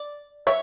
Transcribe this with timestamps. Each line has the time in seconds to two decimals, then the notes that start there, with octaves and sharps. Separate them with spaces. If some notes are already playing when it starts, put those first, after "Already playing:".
Already playing: D5
0.47 C#5 E5